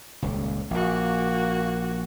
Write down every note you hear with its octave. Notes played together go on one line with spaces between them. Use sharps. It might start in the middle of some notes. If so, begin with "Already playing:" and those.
D#1 C#2
A#1 A#3 F#4